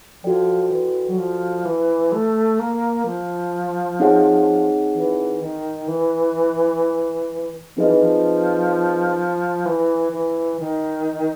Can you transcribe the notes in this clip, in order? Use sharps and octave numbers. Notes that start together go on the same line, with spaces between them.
F3 F#4 A4 D5 G5
E3
F#3
F3
E3
A3
A#3
F3
C4 D#4 G#4 C#5 F#5
E3
D#3
E3
F3 C4 D#4 G#4 B4 D#5
E3
F3
E3
E3
D#3